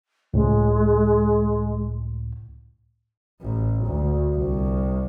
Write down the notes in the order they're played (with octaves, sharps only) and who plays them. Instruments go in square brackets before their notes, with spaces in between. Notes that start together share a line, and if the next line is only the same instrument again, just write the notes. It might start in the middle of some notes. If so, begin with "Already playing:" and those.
[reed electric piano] C#2 A2 [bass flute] G#3
[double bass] A1
D2
C2